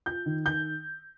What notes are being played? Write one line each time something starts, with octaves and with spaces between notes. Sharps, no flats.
F4 G6
D#3
D#3 G6